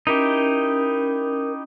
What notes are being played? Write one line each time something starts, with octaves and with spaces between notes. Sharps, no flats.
C#4 D#4 E4 G4 A#4